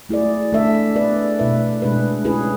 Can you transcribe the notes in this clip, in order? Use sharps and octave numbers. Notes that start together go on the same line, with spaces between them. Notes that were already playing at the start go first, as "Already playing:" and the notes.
A3 E4 G#4 D5
A3 D4 A4 E5
B3 D4 G#4 B4 D5
B2 A3 E4 B4 E5
B2 G#3 D4 G#4 B4
C#4 E4 G#4 B4